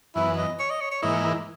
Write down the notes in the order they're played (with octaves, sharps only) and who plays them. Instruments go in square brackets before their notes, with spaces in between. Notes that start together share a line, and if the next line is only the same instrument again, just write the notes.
[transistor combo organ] F#2 E3 B3 [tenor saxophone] E4
[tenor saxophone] D#5
C#5
D#5
C#5
C#5
[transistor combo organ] G#2 E3 A#3 E4 [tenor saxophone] D#5